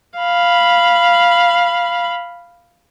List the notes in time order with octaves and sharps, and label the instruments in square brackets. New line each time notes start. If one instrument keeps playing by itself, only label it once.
[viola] F5 B5